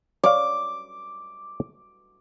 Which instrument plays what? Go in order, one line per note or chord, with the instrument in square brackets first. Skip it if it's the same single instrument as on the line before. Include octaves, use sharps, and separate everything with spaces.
[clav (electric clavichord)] C#5 D5 F5 [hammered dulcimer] D6